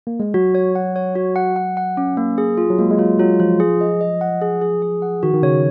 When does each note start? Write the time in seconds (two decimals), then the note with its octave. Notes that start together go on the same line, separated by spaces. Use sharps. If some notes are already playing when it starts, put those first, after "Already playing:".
0.07 A#3
0.20 G#3
0.34 F#3 F#4
0.55 C#5
0.75 F#5
0.96 C#5
1.15 F#4
1.36 F#5
1.56 F#5
1.77 F#5
1.97 C#4
2.17 A#3
2.38 G#4
2.58 F4
2.70 F#3
2.79 G#3 A#3
2.91 G#3
2.99 F#3 F4
3.19 F#3 F4
3.40 F3 F4
3.60 G#4
3.81 D#5
4.01 D#5
4.21 F#5
4.41 G#4
4.61 G#4
4.82 G#4
5.02 F#5
5.23 D#3 F#4
5.34 D#3
5.43 C#3 C#5